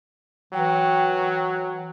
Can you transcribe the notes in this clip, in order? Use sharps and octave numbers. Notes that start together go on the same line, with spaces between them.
E3 F#3 G5